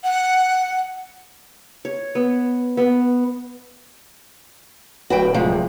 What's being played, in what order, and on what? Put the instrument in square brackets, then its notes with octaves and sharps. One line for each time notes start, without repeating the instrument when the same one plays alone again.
[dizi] F#5
[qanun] C#5
B3
B3
[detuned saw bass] D1 [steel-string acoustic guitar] F#4 B4 G5
[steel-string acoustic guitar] C3 F3 G#3